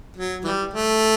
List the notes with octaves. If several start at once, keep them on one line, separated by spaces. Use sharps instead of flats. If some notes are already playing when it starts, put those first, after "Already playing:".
F#3
E3 G3
A3